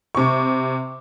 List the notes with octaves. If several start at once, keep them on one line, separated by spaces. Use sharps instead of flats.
C3 C#6